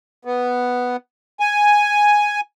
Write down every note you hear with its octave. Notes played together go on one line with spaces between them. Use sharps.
B3
G#5